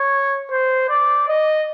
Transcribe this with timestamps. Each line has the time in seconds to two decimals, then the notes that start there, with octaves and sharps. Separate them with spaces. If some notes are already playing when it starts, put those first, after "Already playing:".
Already playing: C#5
0.51 C5
0.89 D5
1.29 D#5